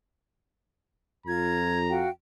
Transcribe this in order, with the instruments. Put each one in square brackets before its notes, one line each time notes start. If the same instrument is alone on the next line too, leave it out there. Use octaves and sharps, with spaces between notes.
[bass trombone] F2 [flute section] F4 G#6 [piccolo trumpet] A#5
[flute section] F#4 F5 G5